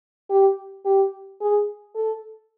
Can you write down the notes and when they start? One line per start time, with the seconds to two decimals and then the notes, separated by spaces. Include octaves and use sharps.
0.30 G4
0.85 G4
1.41 G#4
1.95 A4